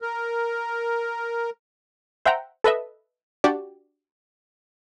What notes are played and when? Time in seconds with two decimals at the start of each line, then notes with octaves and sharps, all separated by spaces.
0.02 A#4
2.25 C5 E5 F#5 G5 A#5
2.64 A4 B4 D#5 E5
3.44 D4 F#4 G4 D5